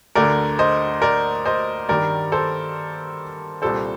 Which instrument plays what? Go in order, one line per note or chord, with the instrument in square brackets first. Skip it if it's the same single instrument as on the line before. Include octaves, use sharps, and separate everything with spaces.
[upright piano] D2 D3 A3 A#4 D5
C5 D#5
A#4 D5
C5 D#5
G2 D#3 G3 A#4 D5
A4 C5
C2 A#2 G3 A4 C5